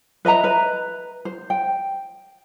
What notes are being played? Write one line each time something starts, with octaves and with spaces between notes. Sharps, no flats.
B4 D#5 E5 A#5
B4
C5
G5